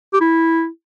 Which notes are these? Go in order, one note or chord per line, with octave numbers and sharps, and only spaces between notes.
G4
E4